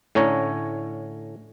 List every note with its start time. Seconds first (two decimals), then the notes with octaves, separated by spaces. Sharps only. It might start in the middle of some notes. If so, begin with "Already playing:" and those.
0.15 A2 D3 C#4 C#5 A#5